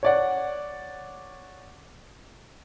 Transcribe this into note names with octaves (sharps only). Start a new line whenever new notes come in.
C#5 D5 F#5